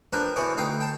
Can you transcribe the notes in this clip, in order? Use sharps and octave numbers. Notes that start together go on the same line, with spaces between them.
F3 D4 G4 A#4 B4
E2 B2 E3 B3 C#5 D6
D2 D#4 F5 G5 A#5
G5 A5